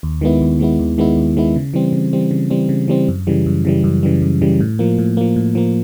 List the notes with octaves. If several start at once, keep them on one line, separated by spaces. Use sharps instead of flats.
D#2
D#3 G#3 B3 E4
D#2
D#3 G#3 B3 E4
D#2
D#3 G#3 B3 E4
D#2
D#3 G#3 B3 E4
C#3
E3 G3 C4
C#3
E3 G3 C4
C#3
E3 G3 C4
C#3
E3 G3 C4
F#2
C#3 E3 G3
F#2
C#3 E3 G3
F#2
C#3 E3 G3
F#2
C#3 E3 G3
A2
F3 A#3
A2
F3 A#3
A2
F3 A#3